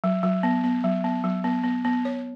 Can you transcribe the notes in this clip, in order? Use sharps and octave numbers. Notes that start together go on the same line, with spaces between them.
F#3
F#3
B3
B3
F#3
B3
F#3
B3
B3
B3
C#5